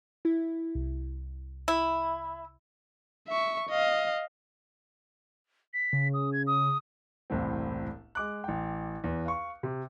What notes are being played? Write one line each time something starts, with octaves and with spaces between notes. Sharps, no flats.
E4
C2
E4
E5 C#6
D#5 F5
B6
C#3
D#6
G#6
D#6
E1 C2 A2 C4
G#3 D6 F#6
A1 G5
E2 B3
F5 C#6
C3